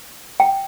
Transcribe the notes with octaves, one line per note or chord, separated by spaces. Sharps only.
G5